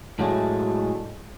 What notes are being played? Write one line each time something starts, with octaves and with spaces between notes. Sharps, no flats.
A2 F#3 G#3 A3 D4